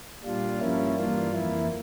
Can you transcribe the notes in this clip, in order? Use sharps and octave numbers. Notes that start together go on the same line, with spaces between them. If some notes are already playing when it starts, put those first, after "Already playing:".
A#2 G3 D4 F4
G2 F3 A#3 C#4 E4
G2 E3 A#3 D4 F4
F2 E3 A#3 E4